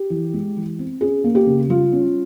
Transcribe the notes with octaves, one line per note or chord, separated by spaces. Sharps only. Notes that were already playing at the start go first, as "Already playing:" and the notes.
Already playing: G4
E3
G#3
E3
C4
C#4 G#4
A#3
G4
C#3
G3 F4
C#4